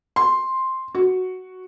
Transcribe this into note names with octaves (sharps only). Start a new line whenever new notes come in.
C6
F#4